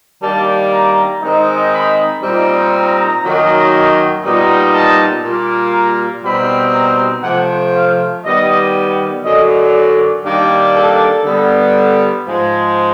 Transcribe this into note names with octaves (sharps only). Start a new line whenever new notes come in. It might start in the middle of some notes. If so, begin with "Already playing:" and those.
D#3 G3 A#3 D4 A5
A#5
D#3 G#3 C4 D#4
B5
A#2 G3 C4 D#4
A#5
F#2 D#3 F#3 A#3 D#4
A#2 G3 B3 D#4
A5
A#2 G3 A#3
A#5
B2 G3 C4 D#4 B5
A#5
C3 F3 A3 F#5
F5
D#3 G3 B3 D#5
F#2 D3 F#3 D#5
D5
D#3 G3 A#3 D4
A4
D3 G3 B3
G#2 F3 G#3